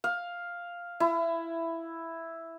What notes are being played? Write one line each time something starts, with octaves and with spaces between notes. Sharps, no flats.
F5
E4